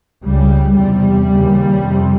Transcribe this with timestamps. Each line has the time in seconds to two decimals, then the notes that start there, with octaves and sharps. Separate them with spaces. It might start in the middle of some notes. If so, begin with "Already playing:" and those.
0.25 C#2 C#3 G3
0.77 E2 C3 G3
1.30 D#2 C#3
1.81 F2 C3